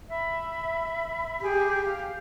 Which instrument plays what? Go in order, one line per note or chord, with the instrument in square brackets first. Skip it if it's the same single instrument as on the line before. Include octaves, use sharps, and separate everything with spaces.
[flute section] E5 B5
[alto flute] G4 [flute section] G#4 G5
[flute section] F5